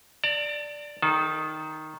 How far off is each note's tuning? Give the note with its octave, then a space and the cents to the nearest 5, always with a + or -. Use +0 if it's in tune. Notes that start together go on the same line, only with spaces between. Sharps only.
D5 +0 A5 +45
D#3 +0 A4 -30 A5 -30